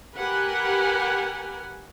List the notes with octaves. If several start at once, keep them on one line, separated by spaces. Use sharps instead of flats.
G4 A#4 B4 F#5 G#5